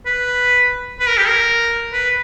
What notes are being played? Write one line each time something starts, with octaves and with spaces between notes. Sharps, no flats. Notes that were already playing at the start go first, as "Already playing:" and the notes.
B4
B4
A#4
G4
A#4
B4